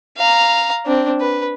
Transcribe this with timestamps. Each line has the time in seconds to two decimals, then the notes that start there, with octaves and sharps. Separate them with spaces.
0.17 F5 A#5
0.86 C4 D4
1.20 B4